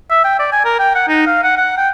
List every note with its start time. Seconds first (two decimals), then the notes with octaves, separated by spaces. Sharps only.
0.11 E5
0.25 G5
0.39 D5
0.53 G#5
0.65 A#4
0.80 G5
0.95 F#5
1.08 D#4
1.26 F5
1.43 F#5
1.57 F#5
1.78 G5